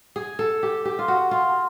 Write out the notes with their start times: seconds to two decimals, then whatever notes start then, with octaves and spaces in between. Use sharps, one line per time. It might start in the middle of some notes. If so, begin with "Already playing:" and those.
0.16 G#4
0.39 A4
0.63 G4
0.85 G4
0.99 F4
1.08 F#4
1.31 F4